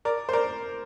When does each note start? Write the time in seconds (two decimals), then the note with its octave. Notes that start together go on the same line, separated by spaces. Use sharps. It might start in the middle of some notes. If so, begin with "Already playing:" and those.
0.05 A#4 D5
0.29 C5
0.33 A#4 D5